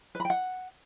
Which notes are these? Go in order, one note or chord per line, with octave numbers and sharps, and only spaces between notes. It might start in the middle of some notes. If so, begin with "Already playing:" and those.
B4
B5
G5
F#5